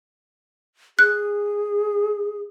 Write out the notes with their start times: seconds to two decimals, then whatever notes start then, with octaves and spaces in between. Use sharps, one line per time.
0.99 G#4 F#6